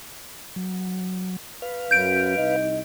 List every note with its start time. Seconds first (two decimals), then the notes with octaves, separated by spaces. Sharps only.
0.56 F#3
1.62 B4 F5
1.91 F#2 G6 D7
2.37 C2 D#4 D#5